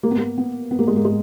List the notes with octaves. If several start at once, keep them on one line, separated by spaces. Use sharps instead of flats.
A#3
B3
A#3
B3
B3
A#3
G#3
A#3
G#3